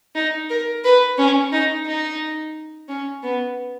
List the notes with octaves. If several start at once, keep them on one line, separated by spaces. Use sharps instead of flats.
D#4
A#4
B4
C#4
D#4
D#4
C#4
B3